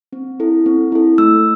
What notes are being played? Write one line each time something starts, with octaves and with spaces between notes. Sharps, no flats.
C4
E4 A4
C4
E4 A4
A3 E6